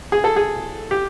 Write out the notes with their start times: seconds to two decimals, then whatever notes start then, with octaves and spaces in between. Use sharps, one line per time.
0.12 G#4
0.24 A4
0.36 G#4
0.91 G4